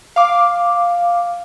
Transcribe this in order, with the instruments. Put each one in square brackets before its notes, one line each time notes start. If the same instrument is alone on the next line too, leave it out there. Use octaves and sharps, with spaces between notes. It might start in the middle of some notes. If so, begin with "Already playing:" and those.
[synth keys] F5 D6